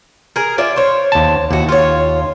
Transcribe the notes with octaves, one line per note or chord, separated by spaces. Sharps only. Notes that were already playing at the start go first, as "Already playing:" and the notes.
G#4 A#4
F4 D5 E5
C5 C#5
D#2 A5
D#2 E4 F#4
F4 C#5